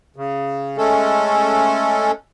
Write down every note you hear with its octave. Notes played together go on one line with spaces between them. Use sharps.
C#3
G#3 A3 C#4 A4